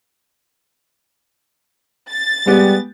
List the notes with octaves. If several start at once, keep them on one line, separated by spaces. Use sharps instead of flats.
A6
G3 G#3 B3 G4